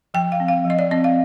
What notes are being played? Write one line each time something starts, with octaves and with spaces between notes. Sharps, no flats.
F3 G5
F5
C4
F5
F3 D#5
D5
C4 D#5
F5